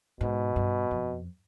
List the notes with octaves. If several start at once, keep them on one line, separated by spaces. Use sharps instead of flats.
G#2 B2
G2
F2